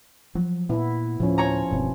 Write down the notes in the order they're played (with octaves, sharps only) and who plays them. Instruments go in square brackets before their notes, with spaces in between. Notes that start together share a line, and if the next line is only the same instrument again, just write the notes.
[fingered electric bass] F3 F#3
[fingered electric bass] A#2 [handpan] B3 E4
[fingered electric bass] D2 A2 [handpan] F3 C#4
[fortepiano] C#5 A#5
[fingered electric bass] E1 G2 C4 [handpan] B2